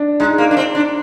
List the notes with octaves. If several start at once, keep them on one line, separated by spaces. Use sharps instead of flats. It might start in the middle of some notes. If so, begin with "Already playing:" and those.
Already playing: D4
G#3 D#4
A#3
D4
C4
D4